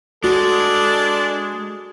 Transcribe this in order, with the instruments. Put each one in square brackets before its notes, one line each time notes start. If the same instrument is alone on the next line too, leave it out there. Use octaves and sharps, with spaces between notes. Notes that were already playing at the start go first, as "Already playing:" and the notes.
[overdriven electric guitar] G#3 [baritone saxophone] D4 [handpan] F#4 [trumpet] A4